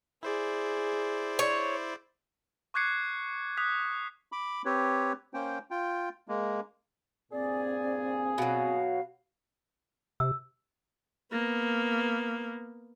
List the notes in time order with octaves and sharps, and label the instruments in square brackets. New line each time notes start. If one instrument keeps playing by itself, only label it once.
[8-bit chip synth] E4 C5 D5 [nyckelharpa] G#4
[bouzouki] C#5
[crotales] C#6 D6 F#6 G#6 C7 C#7
D#6 F#6 B6
[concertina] B5 D6
C4 G4 B4 C#5
A#3 C#4 C5 G5
F4 G5
G#3 A#3
[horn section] G2 A#2 G#4 [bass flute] C4 [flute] D5
[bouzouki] B2 F#3 [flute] F5
[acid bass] C3 [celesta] E6
[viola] A#3 B3